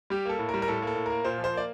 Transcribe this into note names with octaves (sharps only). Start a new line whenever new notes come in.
G3 G4
A#3 A4
A2
A#4
G3
A#4
A2 A4
A#3 A4
A2
A#3 A#4
A#2 C5
F3
C5
A#3 D5